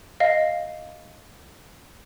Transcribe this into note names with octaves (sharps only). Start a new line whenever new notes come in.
D#5 F5